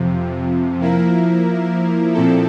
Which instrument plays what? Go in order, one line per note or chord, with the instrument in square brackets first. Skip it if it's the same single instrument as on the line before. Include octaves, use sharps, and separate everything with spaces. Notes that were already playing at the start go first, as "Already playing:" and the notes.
Already playing: [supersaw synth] F2 C3 F3
F3 A#3 E4 A#4
A#2 F3 C4 E4 A4